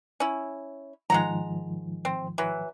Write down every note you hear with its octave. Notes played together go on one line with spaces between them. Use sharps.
C#4 E4
G#2 D#3 F3 G#3 F#5 A#5
C4
E3 F#3 E4